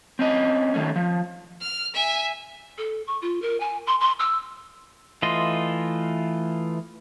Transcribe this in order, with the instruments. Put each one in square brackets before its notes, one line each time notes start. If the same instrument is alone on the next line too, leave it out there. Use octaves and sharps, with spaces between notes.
[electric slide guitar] C4 C#4 D#5
D#3 A3 C#4
F3
[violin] F6
E5 G#5
[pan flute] A4
C#6
F4
A#4
G#5
C6
C6
E6
[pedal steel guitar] E3 A3 F4 D#5 C6